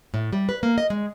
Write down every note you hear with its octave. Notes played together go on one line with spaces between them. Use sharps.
A2
G3
B4
A#3
D#5
G#3